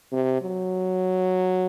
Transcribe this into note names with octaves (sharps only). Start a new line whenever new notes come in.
C3
F#3